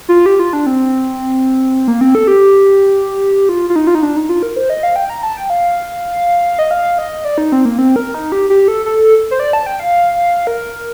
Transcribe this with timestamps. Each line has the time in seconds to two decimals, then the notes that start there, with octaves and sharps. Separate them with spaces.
0.09 F4
0.26 G4
0.40 F4
0.53 D4
0.66 C4
1.88 A#3
2.01 C4
2.15 A4
2.28 G4
3.49 F4
3.70 F4
3.76 D#4
3.87 F4
3.95 D#4
4.03 D4
4.16 D#4
4.29 F4
4.43 A#4
4.56 C5
4.70 D#5
4.83 F5
4.96 G5
5.10 A#5
5.23 A5
5.37 G5
5.50 F5
6.59 D#5
6.71 F5
6.98 D#5
7.25 D5
7.38 D#4
7.52 C4
7.65 A#3
7.78 C4
7.96 A#4
8.14 D#4
8.32 G4
8.50 G4
8.68 A4
8.86 A4
9.31 C5
9.40 D5
9.53 A5
9.66 G5
9.80 F5
10.47 A#4